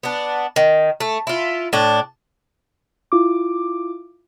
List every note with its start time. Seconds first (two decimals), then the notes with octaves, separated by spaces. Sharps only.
0.03 B3 D4
0.56 D#3
1.00 A3
1.27 E4 F4
1.73 A2 D4
3.12 E4 F4 D6